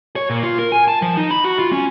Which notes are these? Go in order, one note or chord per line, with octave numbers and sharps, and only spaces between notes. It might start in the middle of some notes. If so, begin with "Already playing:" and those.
C#5
A#2
F4
A#4
G#5
A5
F3
D#4
B5
F#4
F4
C#4